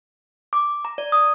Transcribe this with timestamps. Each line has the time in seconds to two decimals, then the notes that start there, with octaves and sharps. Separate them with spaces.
0.53 D6
0.85 A#5
0.98 D5
1.12 D#6